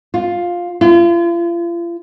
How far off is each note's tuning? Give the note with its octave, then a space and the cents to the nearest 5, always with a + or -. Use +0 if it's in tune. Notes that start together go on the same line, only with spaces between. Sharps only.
F4 +10
F4 -40